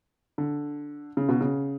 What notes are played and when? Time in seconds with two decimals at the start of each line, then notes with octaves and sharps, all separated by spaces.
0.38 D3
1.17 C#3
1.29 B2
1.41 C#3